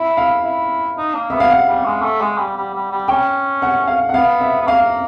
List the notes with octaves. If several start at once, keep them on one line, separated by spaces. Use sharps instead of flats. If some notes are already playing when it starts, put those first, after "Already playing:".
Already playing: E4 E5
F5
E4
D#4
A#3
B3 E5
F5
F#5
G3
G#3
A3
G#3
G3
G3
G3
G3
C#4 G5
F#5
F5
F#5
B3 F5
E5
B3
A#3 F5